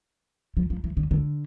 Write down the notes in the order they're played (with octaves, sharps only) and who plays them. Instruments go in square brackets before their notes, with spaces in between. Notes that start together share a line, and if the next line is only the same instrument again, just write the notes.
[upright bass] F3
F3
E3
D3
D3